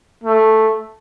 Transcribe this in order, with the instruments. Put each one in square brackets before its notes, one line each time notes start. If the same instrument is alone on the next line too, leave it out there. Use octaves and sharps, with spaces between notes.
[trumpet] A3